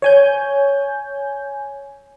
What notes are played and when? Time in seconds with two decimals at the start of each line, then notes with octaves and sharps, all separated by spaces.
0.02 C#5 G#5 G6